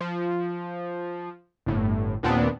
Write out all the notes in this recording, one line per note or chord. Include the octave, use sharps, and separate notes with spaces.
F3
G1 A2
D#2 A#2 B3 C4 D4